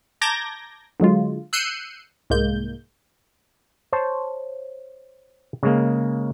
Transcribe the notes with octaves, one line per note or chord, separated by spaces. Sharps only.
A5 A#5 D6 G6 G#6 A#6
D3 F#3 G#3 F4
E6 F#6 G6 C7 C#7 D#7
C2 G#2 G#3 A#3 G6
C5 C#5 A5
C#3 G#3 A#3